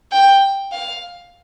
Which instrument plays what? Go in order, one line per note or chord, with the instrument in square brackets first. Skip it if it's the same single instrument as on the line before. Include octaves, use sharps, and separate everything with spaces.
[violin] G5
F5